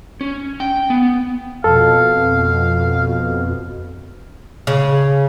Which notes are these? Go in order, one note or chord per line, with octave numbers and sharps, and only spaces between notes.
C#4
G5
B3
F2 B2 A4 F5
C#3